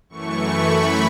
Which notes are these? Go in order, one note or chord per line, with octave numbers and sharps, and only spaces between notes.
F#2 E3 A3 C#6
B5